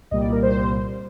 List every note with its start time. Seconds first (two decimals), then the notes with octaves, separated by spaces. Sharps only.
0.11 C2 A#2 G3 A#3 D#5
0.21 D5
0.32 A#4
0.43 C5